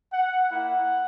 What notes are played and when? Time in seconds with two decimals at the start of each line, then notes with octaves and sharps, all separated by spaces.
0.13 F#5
0.49 A#3 E4 F#5